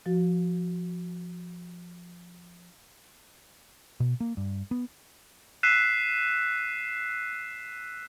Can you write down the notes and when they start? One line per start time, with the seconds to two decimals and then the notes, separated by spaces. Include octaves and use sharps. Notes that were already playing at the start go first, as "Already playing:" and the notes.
0.06 F3 F#4
4.00 B2
4.20 A#3
4.37 G2
4.71 B3
5.63 E6 F#6 B6 C7 D#7 E7